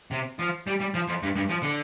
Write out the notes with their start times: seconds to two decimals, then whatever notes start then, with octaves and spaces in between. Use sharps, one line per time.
0.11 C3
0.39 F3
0.67 G3
0.80 G3
0.94 F3
1.08 F2
1.22 G2
1.36 G2
1.50 F3
1.63 D3